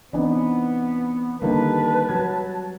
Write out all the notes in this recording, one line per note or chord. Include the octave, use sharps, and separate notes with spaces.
E3 B3 C4 D4 D#4 G#5
D3 D#3 G3 A#3 B4 A5
F#3 G#6